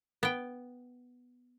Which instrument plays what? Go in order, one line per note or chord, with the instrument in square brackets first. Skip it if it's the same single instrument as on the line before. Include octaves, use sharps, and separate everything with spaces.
[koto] B3 G5